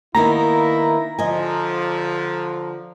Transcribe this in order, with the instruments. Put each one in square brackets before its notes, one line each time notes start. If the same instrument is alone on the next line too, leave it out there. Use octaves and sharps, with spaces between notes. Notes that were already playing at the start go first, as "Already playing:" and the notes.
[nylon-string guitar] D#3 A#3 B3 [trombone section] E4 [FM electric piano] A#5 A#6
[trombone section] D3 F3 [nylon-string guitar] D#5 G#5